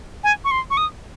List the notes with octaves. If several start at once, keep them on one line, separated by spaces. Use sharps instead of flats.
G#5
C#6
C6
C#6
D#6